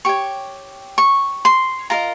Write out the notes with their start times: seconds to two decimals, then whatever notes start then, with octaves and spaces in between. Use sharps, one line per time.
0.05 G4 C#5 C#6
0.98 C#6
1.45 C6
1.90 F4 A#4 D#5 A#5